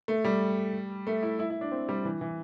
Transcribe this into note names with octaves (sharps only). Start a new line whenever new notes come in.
A3
G3
A3
E4
E4
E4
D4
C4
G3
E3
E3